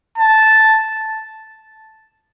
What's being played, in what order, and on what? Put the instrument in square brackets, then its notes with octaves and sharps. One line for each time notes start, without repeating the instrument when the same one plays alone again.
[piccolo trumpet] A5